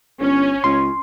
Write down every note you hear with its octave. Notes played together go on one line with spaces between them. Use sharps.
G1 C#4
C#2 C6